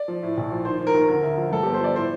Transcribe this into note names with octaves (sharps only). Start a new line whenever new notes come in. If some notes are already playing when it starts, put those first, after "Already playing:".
Already playing: D5
F3
A2
A#1
F3
D#3 C5
D#3
A#4
D#2
D3 A#4
D2
F3
G2 A4
G1 G4
C5
F3 D5
A2 C5